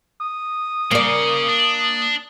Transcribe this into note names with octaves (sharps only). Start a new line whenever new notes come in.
D#6
C#3 A#3 C#4 D5
D4